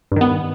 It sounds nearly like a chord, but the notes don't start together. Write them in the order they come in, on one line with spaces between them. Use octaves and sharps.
G2 D#3 B3